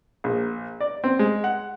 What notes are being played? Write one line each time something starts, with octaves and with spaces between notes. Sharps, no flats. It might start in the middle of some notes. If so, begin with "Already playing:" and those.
A#1
D5
C4
G#3
F#5